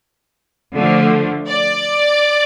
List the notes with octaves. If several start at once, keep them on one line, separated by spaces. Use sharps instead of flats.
D3 F3 A3
D5